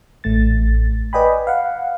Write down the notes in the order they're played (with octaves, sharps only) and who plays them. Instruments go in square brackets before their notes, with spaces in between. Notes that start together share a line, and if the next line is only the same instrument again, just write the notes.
[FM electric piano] A1 A3 A6
B4 D5 D#5 G5 G#5 B5
F5 F#5